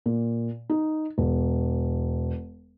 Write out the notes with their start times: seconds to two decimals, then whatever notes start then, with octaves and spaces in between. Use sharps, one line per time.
0.06 A#2
0.69 D#4
1.18 E1